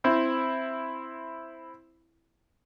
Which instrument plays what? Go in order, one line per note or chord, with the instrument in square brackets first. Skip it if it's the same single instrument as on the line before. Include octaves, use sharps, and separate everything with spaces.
[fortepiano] C4 E4